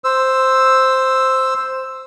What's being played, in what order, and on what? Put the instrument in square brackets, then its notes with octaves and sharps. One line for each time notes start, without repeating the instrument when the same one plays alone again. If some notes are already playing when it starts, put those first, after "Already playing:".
[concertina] C5 E6